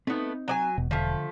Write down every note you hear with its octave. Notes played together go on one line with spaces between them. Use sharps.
A3 B3 C4 D#4
F#3 D5 G#5
E1 B2
D3 F3 A3 F5